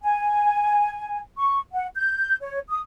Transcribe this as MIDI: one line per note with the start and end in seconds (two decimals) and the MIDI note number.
0.03 1.18 80
1.37 1.58 85
1.72 1.87 78
1.95 2.35 91
2.41 2.59 73
2.69 2.79 87